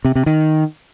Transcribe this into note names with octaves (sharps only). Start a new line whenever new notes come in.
C3
C3
D#3